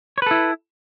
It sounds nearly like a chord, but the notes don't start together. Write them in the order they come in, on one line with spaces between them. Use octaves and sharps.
C#5 B4 A4 E4